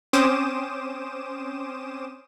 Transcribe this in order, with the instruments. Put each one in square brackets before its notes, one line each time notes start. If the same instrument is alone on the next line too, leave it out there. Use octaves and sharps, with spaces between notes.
[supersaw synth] C4 C#4 C5 D6 D#6 E7